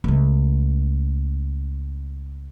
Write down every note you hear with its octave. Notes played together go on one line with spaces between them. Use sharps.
C#2 A3